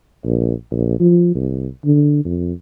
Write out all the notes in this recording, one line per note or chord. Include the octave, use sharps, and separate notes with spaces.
A#1
A#1
F3
C2
D3
F2